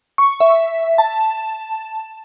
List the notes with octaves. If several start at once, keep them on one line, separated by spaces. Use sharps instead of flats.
C#6
E5
A5